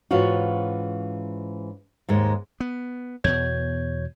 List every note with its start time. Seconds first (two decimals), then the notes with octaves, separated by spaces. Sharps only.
0.11 G#2 E3 C#4 F4 F#4
2.08 D#2 G#2 G#3
2.60 B3
3.24 E2 B2 C#5 G6 G#6